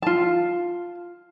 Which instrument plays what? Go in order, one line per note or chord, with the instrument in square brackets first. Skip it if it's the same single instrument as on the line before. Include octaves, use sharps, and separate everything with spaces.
[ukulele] F4 A5